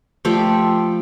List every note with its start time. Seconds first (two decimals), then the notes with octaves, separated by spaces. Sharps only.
0.25 F3 A3 G4 D5